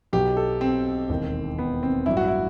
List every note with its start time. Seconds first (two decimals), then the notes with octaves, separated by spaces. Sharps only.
0.13 B1 B2 F#3 G4
0.37 A4
0.61 C4
1.09 E1 D#2 D#3
1.58 B3
1.83 C4
2.06 A1 G2 F#3 E4
2.17 F#4
2.28 E4